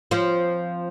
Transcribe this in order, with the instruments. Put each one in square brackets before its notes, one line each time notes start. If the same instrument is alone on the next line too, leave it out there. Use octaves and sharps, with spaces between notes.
[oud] F3 C4